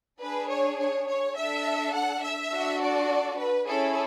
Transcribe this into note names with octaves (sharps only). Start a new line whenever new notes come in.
D4 G#4 B4
C#5
C#5
C#5
D4 A4 E5
F#5
E5
D4 F#4 A4
D5
B4
C#4 E4 G#4 A4